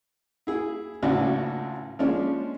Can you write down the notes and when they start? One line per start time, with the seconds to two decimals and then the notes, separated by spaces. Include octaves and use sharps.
0.47 E4 G#4
1.02 G#1 C#2 A2 D4 F#4
1.99 F3 G#3 C#4 D4